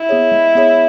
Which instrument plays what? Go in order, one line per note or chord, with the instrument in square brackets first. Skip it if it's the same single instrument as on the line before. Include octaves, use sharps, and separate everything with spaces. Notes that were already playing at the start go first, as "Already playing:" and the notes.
Already playing: [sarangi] E4
[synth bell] B3 G#4 C#5
G#3
B3 G#4 C#5